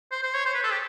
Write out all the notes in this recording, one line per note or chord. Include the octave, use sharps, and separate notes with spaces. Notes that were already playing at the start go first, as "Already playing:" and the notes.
C5
C5
C#5
C5
B4
A4
G4